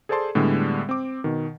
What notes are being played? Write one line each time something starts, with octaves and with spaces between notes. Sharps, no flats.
G#4 A4 C5 D5 A5 C6
A2 D3 G3 G#3 B3
C4 D6
B2 D#3